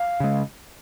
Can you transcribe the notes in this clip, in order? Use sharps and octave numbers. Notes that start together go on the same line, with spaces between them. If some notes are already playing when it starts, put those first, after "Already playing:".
Already playing: F5
C#3 G#3